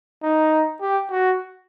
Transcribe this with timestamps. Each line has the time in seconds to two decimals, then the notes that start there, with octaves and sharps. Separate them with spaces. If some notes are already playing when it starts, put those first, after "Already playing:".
0.23 D#4
0.81 G4
1.11 F#4